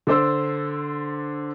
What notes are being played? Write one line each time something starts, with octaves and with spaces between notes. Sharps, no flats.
D3 D4 C5 E6